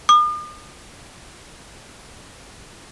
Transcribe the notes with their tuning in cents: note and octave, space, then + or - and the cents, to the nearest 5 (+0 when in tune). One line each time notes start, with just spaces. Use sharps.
D#6 -45